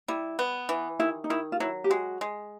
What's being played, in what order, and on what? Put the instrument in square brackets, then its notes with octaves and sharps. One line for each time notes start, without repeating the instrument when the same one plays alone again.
[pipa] G3 [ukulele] E4
[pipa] B3
E3
[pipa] D#3 [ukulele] E4
[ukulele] D#4
[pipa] D#3 [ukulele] E4
[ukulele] F4
[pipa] F#3 [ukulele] E4
[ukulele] G4
[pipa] G#3 [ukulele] F#4
[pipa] G#3